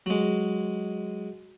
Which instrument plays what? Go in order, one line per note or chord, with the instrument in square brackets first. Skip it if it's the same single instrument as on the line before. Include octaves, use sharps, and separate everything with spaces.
[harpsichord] F#3 G#3